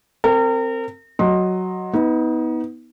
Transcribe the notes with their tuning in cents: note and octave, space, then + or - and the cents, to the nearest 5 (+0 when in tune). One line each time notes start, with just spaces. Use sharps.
C4 +0 A#4 -35
F#3 +0 D#5 +0 C6 +20
B3 +0 D#4 +35